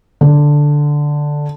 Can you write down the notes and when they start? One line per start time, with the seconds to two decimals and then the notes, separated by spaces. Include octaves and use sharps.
0.21 D3